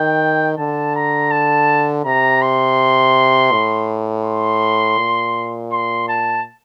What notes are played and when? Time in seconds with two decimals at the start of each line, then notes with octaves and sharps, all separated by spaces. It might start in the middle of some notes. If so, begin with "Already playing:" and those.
Already playing: D#3 G5
0.58 D3 A5
0.96 A#5
1.31 A5
2.05 C3 A#5
2.42 C6
3.52 A2
4.25 C6
4.98 A#2
5.72 C6
6.08 A5